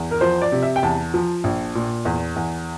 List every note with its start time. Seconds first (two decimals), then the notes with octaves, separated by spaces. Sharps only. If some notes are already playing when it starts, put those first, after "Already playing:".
Already playing: E2
0.11 A#4
0.21 F3 C5
0.42 D5
0.52 C3
0.62 E5
0.76 G5
0.83 E2 A5
1.14 F3
1.44 A#1
1.75 A#2
2.05 E2
2.36 E2